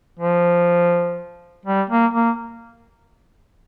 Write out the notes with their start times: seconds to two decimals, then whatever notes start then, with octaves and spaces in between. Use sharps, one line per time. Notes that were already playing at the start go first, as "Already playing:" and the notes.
0.20 F3
1.65 G3
1.90 A#3
2.14 A#3